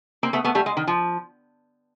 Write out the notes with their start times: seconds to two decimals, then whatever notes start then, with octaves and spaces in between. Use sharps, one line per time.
0.23 A#3 C4
0.33 A3 B3
0.44 A3 B3
0.55 G3 A3
0.66 G#3
0.77 D#3
0.87 F3